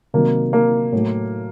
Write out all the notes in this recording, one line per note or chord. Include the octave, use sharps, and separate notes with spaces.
C3 D#3 F#3 A#3
A#3
A2 F#3